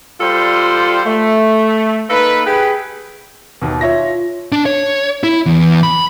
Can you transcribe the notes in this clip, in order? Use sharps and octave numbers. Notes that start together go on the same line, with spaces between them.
G3 F4 A4 C5 D5
A3
A#3 D#4 A4 B4
G4 G#4 B4
D#2 B2
F4 C#5 E5 A#6
D4
C#5
E4
E2
B5